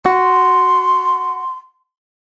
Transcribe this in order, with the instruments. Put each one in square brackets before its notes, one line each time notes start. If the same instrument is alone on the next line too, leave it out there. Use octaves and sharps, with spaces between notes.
[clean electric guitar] F#4 [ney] C6